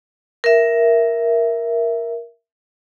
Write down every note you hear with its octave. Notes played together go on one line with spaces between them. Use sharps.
A#4 E5